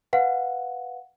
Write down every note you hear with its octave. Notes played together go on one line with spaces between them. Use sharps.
B4 F5 F#5